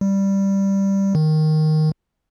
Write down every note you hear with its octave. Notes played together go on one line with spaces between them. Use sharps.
G3
D#3